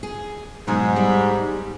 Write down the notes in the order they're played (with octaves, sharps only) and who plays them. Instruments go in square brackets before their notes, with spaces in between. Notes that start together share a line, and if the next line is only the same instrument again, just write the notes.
[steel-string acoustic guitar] G#4
[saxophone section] G#2 [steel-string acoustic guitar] B2 F#3 G#3
[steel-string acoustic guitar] G3